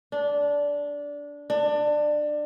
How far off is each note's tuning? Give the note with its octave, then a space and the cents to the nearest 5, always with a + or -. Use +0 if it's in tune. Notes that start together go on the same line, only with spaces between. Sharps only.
D4 -15
D4 +20